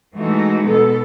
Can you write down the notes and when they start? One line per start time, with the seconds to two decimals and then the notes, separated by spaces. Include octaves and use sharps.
0.16 E3 G#3 A3 D#4 F#4
0.66 B2 B3 A4